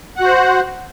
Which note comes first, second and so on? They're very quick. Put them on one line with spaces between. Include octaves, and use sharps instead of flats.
F#5 F#4 C5